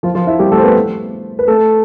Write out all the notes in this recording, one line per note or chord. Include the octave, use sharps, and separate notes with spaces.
F3 F4
F3 F4
E4 E5
G3 G4
A3 A4
C5
B3 B4
B4
A3 A4